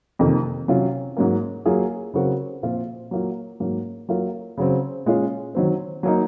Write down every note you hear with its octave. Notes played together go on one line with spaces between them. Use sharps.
F2 C3 D#3 A#3
C3 F#3 C#4 F4
G#2 F#3 A#3
F#3 A#3 F4 G#4
C#3 F#3 C4 F#4 A#4
A#2 F3 C4 F4
F#3 A#3 F4
G#2 F#3 A#3
F#3 A#3 F4 A#4
C#3 F#3 C4
A#2 G#3 C#4 F4
D#3 F#3 C4
F#3 A#3 D#4